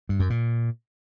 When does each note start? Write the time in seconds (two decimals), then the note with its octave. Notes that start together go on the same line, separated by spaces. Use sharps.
0.09 G2
0.20 F#2
0.30 A#2